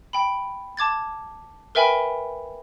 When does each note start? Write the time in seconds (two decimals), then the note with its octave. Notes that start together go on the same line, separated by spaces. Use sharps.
0.13 G5 B5
0.77 A5 D6 G#6 A6
1.75 A#4 B4 E5 G5 G#5 B5